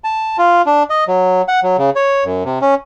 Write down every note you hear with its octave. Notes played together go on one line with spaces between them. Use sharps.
A5
F4
D4
D#5
F#3
F#5
F#3
C#3
C#5
F#2
C3
C#4